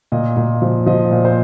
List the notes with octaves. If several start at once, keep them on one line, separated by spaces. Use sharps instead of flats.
A#2 D#5
A#2
F3
F3 D#5
A#2
C5